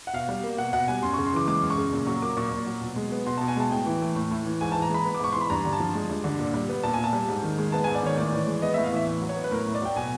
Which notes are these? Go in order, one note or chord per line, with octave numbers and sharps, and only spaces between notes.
F#5
B2 F5
G3
A#3
B2 F#5
B2 F#5
G3 G#5
F#2 C6
C#6
C#3
C6
E3 D6
G#3 D6
F#2
C#6
C#3
A#2
F#3 C#6
A#3 D6
A#2 C#6
A#2
F#3
B2
G#3
B3
B2 C6
A5
B2
G#5
G#3 A5
A2 G5
E3
A3
A2
A2
E3
G#2 G#5
A5
E3
A#5
G#3 B5
B3
D6
G#2 C#6
E3 C6
B5
G2 A#5
D3
A5
F3
G#3
G2
D3
A#2
G3
B3
A#2 A5
G#5
A#2
A5
G3
G#2
D#3
G#3
B3 A5
G#5
G#2
D5
D#3 C#5
A2 D5
E3
G#3
B3 D#5
E5
A2
F5
E3 E5
A2
F#3
C#5
B3
B4
A2 A#4
A2
D5
F#3 G5
B2 G#5